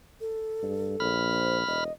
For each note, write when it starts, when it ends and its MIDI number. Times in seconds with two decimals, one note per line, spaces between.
0.21 1.13 69
0.63 0.95 43
1.00 1.65 34
1.00 1.84 83
1.00 1.84 89
1.31 1.57 72
1.67 1.88 28
1.67 1.92 75